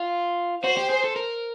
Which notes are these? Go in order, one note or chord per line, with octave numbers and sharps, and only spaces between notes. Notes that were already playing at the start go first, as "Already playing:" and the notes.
Already playing: F4
F#4 C5
G4
G#4
A4
A#4